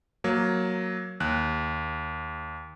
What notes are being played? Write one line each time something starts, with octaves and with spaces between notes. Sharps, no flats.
F#3 A#3
D#2 F#6